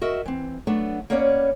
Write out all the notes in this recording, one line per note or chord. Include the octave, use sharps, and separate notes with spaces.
F#4 A#4 D#5 E5
E3 C4
F#3 A3 B3 D4
A#3 B3 C#4 C#5 D5